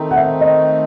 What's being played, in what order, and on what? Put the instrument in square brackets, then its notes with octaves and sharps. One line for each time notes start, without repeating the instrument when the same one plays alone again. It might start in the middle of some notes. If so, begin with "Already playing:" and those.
Already playing: [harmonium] D#3 A3 C4 D#4
[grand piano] F#5
E5
D#5